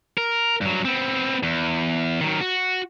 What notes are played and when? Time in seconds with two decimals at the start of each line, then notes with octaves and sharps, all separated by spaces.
0.18 A#4
0.61 G2 F#3
0.85 B3 C4
1.43 E2
2.21 D#3 F#3
2.41 F#4